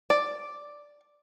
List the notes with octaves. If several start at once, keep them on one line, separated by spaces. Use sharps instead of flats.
D5